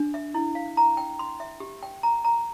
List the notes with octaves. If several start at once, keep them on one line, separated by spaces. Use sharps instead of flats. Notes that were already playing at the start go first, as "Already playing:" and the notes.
Already playing: D4
E5
E4
F5
A#5
G5
C6
E5
G4
G5
A#5
A#5